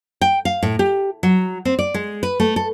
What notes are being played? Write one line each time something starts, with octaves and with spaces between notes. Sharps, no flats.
G5
F5
A2
G4
F#3
C4
D5
G#3
B4
A3
A4